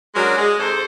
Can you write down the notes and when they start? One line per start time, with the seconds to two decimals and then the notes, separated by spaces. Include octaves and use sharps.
0.15 F#3 G#3 C#4 D4 F#4 A#4
0.38 G#3
0.59 G#2 C3 A4 C5